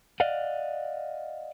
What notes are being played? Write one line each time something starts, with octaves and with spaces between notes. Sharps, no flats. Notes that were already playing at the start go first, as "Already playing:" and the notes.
D5 D#5 F5 F#5